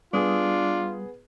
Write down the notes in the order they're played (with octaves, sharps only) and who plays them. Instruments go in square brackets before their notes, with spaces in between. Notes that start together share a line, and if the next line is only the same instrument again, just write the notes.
[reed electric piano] G3 D#6 [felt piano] B3 G#4 [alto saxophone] D4 [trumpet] F4